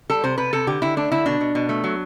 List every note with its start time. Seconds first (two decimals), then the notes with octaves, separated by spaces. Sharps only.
0.10 G3 A4
0.24 C3 C5
0.38 C3 B4
0.53 C3 A4
0.67 D3 G4
0.82 D3 E4
0.97 A3 D4
1.12 D3 E4
1.26 B2 D4
1.41 B2
1.55 B2
1.69 A3
1.84 F#3